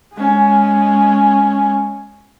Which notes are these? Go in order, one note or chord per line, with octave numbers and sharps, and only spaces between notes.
G#3 C#4